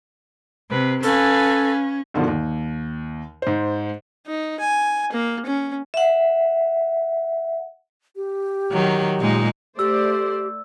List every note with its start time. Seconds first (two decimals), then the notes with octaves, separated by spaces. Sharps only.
0.70 C3 B4
1.03 C#4 A4 B4 F5 G#5
2.14 G2 B2 D3 D#3 F3
2.28 D#2
3.42 G#2 C5
4.27 D#4
4.60 G#5
5.12 A#3
5.46 C#4
5.94 E5 F#5
8.16 G4
8.71 D#3 F#3
9.19 A#2 G#3 D#4
9.79 A3 G4 C5 D5 E6